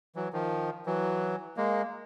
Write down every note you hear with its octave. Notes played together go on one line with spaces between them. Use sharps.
E3 F#3
D#3 F3
E3 F#3
G#3 A#3